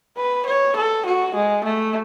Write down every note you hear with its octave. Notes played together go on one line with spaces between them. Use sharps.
B4
C#5
A4
F#4
G#3
A3